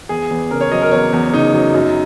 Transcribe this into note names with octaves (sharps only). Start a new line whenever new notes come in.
E2 G#4
E2
C#3 A#4
C#5
F#3 D#5
A#4
E2 C#5
E2
C#3 D#4
F#3
F#2